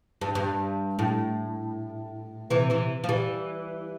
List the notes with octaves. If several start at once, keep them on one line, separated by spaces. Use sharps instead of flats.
G2
G2
A2
C3 E3
C3 E3
F3
E3 G3